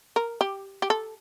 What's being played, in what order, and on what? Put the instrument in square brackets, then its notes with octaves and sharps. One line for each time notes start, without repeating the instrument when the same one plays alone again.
[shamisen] A#4
G4
G4
A4